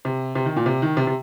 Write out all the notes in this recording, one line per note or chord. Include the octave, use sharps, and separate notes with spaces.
C3
C3
D#3
A#2
C3
D#3
C3
C3